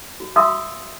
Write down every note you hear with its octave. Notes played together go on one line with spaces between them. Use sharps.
F#4
F#4 E5 F5 C6 D#6 E6